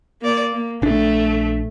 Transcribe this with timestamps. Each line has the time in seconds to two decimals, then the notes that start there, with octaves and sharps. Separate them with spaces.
0.21 A#3 D5
0.52 A#3
0.82 A#1 A3 D4